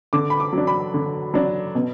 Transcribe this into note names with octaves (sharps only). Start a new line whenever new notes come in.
D3 D6
B5
D6
F#3 D4
B5
D3
F#3 D4
B2